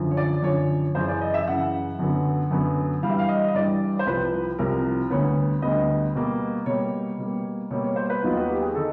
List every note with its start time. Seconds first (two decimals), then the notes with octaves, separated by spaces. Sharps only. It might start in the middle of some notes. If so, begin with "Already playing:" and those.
Already playing: F#2 D3 F3
0.11 C#5
0.17 D5
0.43 F#2 D3 F3 C#5
0.95 F#2 C#3 E3 C5
1.08 D5
1.21 D#5
1.34 E5
1.47 F#2 C#3 E3 F#5
1.99 F#2 D3 F#3 B3
2.51 F#2 D3 F#3 B3
3.03 G2 E3 G3 F5
3.10 E5
3.19 F5
3.29 D#5
3.48 D#5
3.54 G2 E3 G3 D5
3.99 C5
4.07 C2 C3 F3 B4
4.59 C2 C3 F3 A#4
5.11 D2 D3 G3 B3 C#5
5.62 D2 D3 G3 B3 D#5
6.15 B2 G3 A#3
6.66 B2 G3 A#3 C#5
7.18 B2 G3 A#3
7.71 B2 G3 A#3 C#5
7.84 C#5
7.96 C5
8.10 B4
8.23 D#2 D#3 F#3 B3 F4
8.36 F#4
8.49 G4
8.62 G#4
8.75 D#3 A4